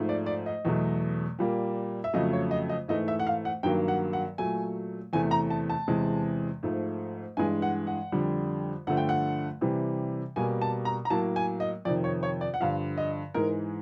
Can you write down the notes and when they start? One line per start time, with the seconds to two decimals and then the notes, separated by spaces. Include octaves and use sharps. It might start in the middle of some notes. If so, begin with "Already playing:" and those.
Already playing: G#2 F3 A3
0.09 D5
0.26 D5
0.46 D#5
0.65 E2 B2 F#3 A3
1.39 A#2 G3 A#3
2.04 E5
2.13 F2 C#3 F#3 A3 D#5
2.33 C#5
2.51 D#5
2.70 D#5
2.88 G#2 E3 A3 D#5
3.08 E5
3.20 F#5
3.27 F5
3.45 F#5
3.63 G2 D#3 F#3 A#3 G5
3.88 F#5
4.13 F#5
4.38 A#2 F#3 A3 G#5
5.13 E2 C3 E3 A3 G#5
5.31 A#5
5.50 A5
5.69 A5
5.88 E2 C3 E3 G#3
6.63 G#2 F3 A3
7.37 G2 E3 G#3 G#5
7.62 F#5
7.87 F#5
8.12 F2 D3 G3
8.87 G2 D3 F3 A3 F#5
8.97 G5
9.09 F#5
9.61 C3 E3 G3
10.36 B2 G3 A#3 G#5
10.61 A5
10.85 A#5
11.05 A#5
11.10 A2 F#3 A#3 A5
11.36 G#5
11.60 D#5
11.85 F2 C3 D#3 D5
12.04 C#5
12.23 C#5
12.41 D5
12.54 F#5
12.60 G2 D3 F3 F5
12.97 D#5
13.34 G#2 E3 G#3 A#4